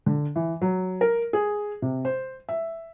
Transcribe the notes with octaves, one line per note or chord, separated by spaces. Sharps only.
D3
E3
F#3
A#4
G#4
C3
C5
E5